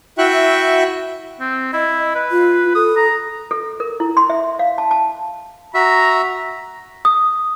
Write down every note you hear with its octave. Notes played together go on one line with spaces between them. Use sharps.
E4 F#4 E5 G5 C#6 F#6
C4
E4 D#5
B4
F4
A4 D#6
A#5
A4
A#4
E4
C6
E5
F5
A5
A5
F#4 E5 A#5
D#6